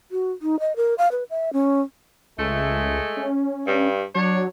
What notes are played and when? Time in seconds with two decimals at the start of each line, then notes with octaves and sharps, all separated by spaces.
0.11 F#4
0.42 D#4
0.60 D#5
0.76 A#4
0.98 F5
1.12 B4
1.30 E5
1.53 C#4
2.38 C#2 G#3 A3
3.17 C#4
3.67 G2
4.15 F#3 D4 C#5